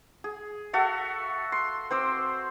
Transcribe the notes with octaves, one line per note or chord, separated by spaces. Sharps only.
G#4
F#4 A4 E5 F5
C6
C4 C5 D6 E6